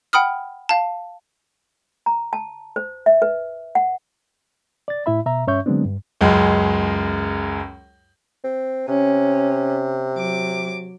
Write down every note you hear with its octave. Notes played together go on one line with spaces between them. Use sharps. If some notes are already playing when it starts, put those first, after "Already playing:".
F#5 G5 B5 D#6 F6
F5 A5
A#5
A5
C5
E5
B4
F#5
D5 A6
A2 E4 E5 B5
B2 E5 A#5
G2 C#4 C#5 E5 C#6 G6
D3 F#3 G#3 B3 C4 D4
G2
C#2 F#2 G#3
C4
C3 C#4
F#3 D6